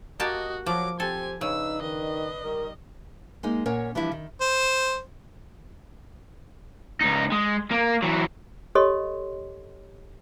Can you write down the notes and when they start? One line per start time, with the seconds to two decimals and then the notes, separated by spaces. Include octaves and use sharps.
0.20 A#3 F#4 G4 D#5 A5
0.66 F3 F#3 D6
1.00 C4 G4 A4 G#5
1.41 C#3 D4 D#4 B4 E6
1.82 D#3 D#5
2.44 D#3 G3 A#4
3.43 G#3 A#3 D#4
3.66 A#2 C#4 A#4 C#5 F#5
3.95 E3 F3 G3 D4 E4
4.12 D#3
4.41 C5
7.01 C#2 D#4
7.32 G#3
7.71 A#3
8.02 E3 F#3
8.75 G4 A4 C#5 D#5 C6